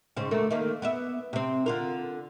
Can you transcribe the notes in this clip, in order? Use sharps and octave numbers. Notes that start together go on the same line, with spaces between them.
G#2 C#3 C4
D2 A3 A#3
D#3 A3 A#3
B3 D5 E5
C3 C4
D3 F4 A#4